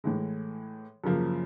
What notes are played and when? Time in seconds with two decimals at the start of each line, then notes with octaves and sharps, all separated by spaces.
0.04 A2 E3 G#3
1.04 F#2 C#3 F3 A#3